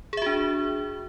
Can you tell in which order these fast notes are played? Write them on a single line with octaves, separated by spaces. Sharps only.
G#4 E5 F#4 D4